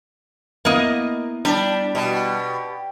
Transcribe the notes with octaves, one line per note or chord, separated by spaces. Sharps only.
A#3 B3 E4 D#5
G3 D4
B2 G4